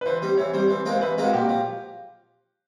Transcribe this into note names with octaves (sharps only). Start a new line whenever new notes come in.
B4
E3 C5
G3 C4
E3 C#5
G3 C4 C5
E3
G#3 C4 F4 A#4
C5
E3 B4
G#3 C4 F4 A#4
F#4
A#2 G4
F3